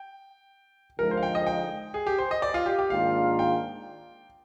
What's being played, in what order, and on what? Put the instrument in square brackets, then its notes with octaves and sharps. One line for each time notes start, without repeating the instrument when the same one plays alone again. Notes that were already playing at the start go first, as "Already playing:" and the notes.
Already playing: [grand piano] G5
[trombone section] D3 F3 G#3 D#4 [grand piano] A#4
[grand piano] C5
F5
G5
D#5
G5
G#4
G4
C5
D#5
D5
F4
G4
G4
[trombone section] G#2 D#3 A#3 D4 F4 [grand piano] F5
[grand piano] G5